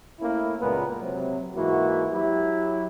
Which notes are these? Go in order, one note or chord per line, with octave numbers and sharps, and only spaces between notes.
A3 A#3 C#4 E4
C#2 A#2 G#3 B3 A#4 B4
C3 F#3
G#2 E3 A#3 E4 F#4
F#3 E4 G4